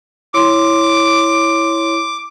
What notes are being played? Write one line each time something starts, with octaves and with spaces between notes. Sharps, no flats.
E4 C#5 C6 D6